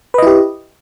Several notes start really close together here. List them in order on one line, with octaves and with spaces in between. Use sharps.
B4 D#5 E4 G4